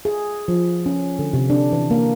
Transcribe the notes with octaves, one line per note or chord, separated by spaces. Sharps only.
G#4
F3
C#4
D3
C3
D4
E3
A#3